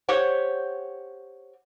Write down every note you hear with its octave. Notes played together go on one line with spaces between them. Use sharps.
G4 C5 C#5 F#5